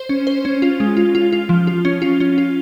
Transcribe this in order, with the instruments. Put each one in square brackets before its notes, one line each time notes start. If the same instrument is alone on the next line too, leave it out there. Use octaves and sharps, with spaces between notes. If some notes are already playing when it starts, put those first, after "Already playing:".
Already playing: [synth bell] C5
C#4
C5
C#4
F4
G#3
F4
F4
F4
F3
F4
C#4
F4
C#4
F4